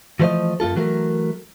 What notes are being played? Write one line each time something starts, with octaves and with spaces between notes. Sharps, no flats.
E3 F3 A3 B4 C5 D#5
F#2 A#3 F4 A4
E3 F#3 A3 A#4